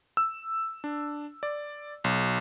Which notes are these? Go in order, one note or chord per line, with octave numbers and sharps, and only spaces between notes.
E6
D4
D5
B1